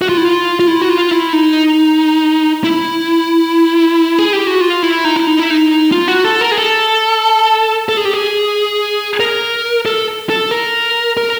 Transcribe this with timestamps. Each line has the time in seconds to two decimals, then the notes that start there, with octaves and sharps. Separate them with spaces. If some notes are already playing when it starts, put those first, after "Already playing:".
0.02 F#4
0.09 F4
0.17 E4
0.25 F4
0.60 F4
0.68 E4
0.82 F#4
0.89 F4
1.11 E4
1.33 D#4
2.64 E4
4.19 G#4
4.33 G4
4.47 F#4
4.61 F4
4.83 E4
5.05 D#4
5.16 E4
5.27 D#4
5.39 E4
5.50 D#4
5.92 F4
6.08 F#4
6.25 A4
6.41 A#4
6.52 G#4
6.58 A4
7.89 A4
7.97 G#4
8.05 G4
8.14 G#4
9.20 A#4
9.86 A4
10.30 A4
10.51 A#4
11.17 A#4